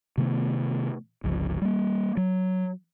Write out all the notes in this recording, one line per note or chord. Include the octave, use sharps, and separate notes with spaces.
C3 D#3 A3 B3
G1 C#2 F3
G3 A#3
F#3